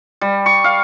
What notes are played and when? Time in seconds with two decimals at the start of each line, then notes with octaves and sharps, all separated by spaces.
0.21 G3
0.46 C#6
0.64 F5